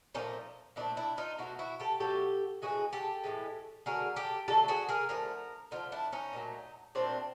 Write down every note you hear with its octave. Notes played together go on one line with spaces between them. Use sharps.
A#2 F3 A3 C#4 D#4
A#2 F3 A3 D4 E4
D4 E4
D#4 F4
B2 F#3 A3 E4 F#4
E4 F#4
G4 A4
B2 F#3 A3 G4 A4
A2 E3 G#3 F#4 G#4
G4 A4
A2 E3 G#3
D3 F#3 A3 G#4 A#4
G4 A4
D3 F#3 A3 G4 A4
F#4 G#4
G#4 A#4
D3 F3 A3 G#4 A#4
D3 F3 A3 D#4 F4
D4 E4
C#4 D#4
A#2 F#3 A3
A#2 F#3 A3 C4 D4